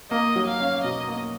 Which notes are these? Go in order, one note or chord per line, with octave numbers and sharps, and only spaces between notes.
A#3 D#5
F#3
F5
C#4
B2 D#5
A#3